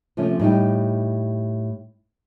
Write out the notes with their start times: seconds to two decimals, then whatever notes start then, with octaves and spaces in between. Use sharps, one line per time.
0.17 C3 F3 A3 C#4
0.40 A2 G3 D#4 G5